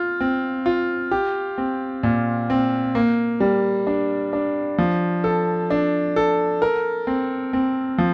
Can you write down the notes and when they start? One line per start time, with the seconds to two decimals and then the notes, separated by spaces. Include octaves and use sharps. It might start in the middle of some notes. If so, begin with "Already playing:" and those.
Already playing: F4
0.21 C4
0.66 F4
1.11 G4
1.58 C4
2.03 A#2
2.50 C4
2.95 A#3
3.40 G3
3.87 D4
4.33 D4
4.78 F3
5.24 A4
5.70 D4
6.16 A4
6.62 A#4
7.07 C4
7.53 C4
7.98 F3